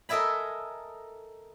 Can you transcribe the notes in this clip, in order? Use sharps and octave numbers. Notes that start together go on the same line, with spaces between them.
A4 A#4 D#5 E5 G#5 B5